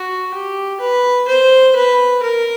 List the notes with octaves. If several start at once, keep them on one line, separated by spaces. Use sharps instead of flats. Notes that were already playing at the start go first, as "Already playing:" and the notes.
Already playing: F#4
G4
B4
C5
B4
A#4